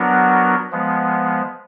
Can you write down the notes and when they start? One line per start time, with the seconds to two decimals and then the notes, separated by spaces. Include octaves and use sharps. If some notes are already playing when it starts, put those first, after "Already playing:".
Already playing: F#3 B3 D4 F#4 A#4
0.72 F3 G#3 B3